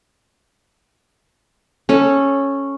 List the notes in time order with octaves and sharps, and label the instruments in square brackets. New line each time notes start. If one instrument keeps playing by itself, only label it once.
[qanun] C#4 A4